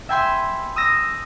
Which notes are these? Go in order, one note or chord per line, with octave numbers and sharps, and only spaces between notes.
E5 G5 G#5 B5 C6
D#6 E6 A#6